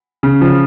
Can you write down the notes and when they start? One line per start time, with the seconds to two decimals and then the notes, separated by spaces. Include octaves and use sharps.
0.23 C#3
0.41 F3